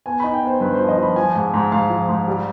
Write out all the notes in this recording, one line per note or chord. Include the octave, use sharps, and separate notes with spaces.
B3 G#5
D#4 B5
G5
B3 C5
G2 B4
C5
F3
D#5
F3
B5
F3 G#5
G#2
G#2
G#2 F5
F3
G#2
G3